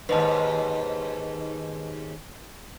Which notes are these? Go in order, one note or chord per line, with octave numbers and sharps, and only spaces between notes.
D#2 G#2 B4 D#5 A5